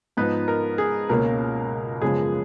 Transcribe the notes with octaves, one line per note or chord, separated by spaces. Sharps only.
G#2 F3 B3 D#4 B4
A#4
G#4
C#2 B2 A#3 C#4 A#4
F#2 C#3 F3 G#3 B3 G#4